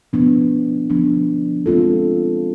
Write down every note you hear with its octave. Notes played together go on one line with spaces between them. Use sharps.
F3 B3 D4
F3 B3 D4
G#3 C4 F4 A4